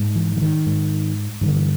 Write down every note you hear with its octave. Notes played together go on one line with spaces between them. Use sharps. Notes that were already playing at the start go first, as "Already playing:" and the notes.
Already playing: G#2
E3
E3
D#3
G#2
G2 D3 D#3
E3